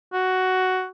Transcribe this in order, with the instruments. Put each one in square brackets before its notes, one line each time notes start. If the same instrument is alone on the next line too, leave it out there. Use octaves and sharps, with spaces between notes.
[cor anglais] F#4